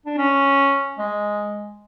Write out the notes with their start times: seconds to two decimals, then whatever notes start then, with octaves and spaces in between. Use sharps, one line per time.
0.06 D4
0.18 C#4
0.98 G#3